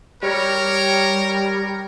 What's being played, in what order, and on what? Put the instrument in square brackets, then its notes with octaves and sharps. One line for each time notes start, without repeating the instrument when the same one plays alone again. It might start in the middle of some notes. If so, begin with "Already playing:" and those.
[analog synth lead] G3 [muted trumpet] A#4 [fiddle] C#5